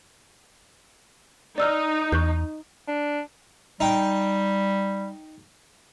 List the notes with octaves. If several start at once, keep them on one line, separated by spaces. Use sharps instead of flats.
D#4 D5 E6 F6
E2 C#6 F#6 G6
D4
G3 D#4 G5